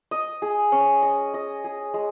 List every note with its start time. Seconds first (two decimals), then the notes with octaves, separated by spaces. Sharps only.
0.11 D#5
0.42 G#4
0.72 C#4
1.02 D#5
1.34 D#5
1.64 G#4
1.94 G#3